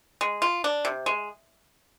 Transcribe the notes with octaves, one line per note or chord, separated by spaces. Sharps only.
G#3
F4
D4
C3
G#3